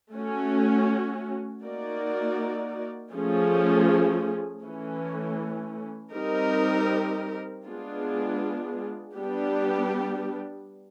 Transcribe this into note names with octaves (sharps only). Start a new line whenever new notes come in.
A3 C#4 F#4
A#3 D#4 F#4 A#4 D5
F3 A3 C#4 F4 G#4
E3 A3 C#4
G3 C4 D#4 G4 A#4
G#3 B3 D4 F4 G#4
G3 B3 D4 G4